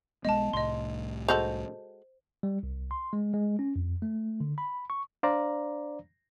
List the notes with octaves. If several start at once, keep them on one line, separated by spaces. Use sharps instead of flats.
B1 G#3 B3 D#5 A5
C2 A2 D#5 C6
G#3 F#4 A4 C5 G6 F7
G3
C2
C6
G#3
G#3
C#4
F2
A3
D3
B5
C#6
D4 C5 D5 F5 A#5